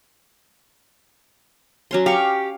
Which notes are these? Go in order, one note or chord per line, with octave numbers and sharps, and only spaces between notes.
F#3 C#4 C6
G4 F5 C#6